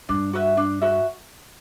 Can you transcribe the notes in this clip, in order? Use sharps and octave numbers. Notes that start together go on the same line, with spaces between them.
G2 D4
F#4 B4 E5
D4
F#4 B4 E5